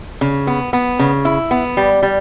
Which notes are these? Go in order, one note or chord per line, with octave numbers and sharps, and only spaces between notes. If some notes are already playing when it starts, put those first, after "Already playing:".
C#3
B3
B3
C#3
E4
B3
G3
G3